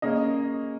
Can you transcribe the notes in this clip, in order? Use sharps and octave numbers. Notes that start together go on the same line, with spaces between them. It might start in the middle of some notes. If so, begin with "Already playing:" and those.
A#3 C#4 G#4 D#5